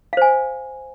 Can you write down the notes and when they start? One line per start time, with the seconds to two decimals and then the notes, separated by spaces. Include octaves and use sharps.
0.13 F5
0.17 C5
0.22 G#5